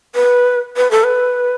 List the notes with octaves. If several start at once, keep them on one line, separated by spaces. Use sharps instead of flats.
B4
B4
A4
B4